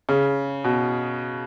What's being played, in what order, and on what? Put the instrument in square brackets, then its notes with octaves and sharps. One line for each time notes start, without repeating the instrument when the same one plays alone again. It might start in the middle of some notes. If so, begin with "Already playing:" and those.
[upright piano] C#3
B2